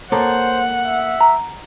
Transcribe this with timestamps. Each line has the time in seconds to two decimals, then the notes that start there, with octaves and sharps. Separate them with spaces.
0.12 A#3 A4 C5 C#5 F#5
0.85 E5
1.21 A#5